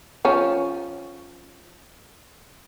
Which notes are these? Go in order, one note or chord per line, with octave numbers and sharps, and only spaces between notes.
F3 C#4